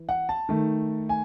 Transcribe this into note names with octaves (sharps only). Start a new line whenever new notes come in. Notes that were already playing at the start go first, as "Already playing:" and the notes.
Already playing: E3
F#5
A5
D#3 A3
G#5